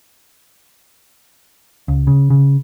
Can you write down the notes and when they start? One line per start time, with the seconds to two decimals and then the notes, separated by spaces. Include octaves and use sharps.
1.88 C#2
2.07 C#3
2.30 C#3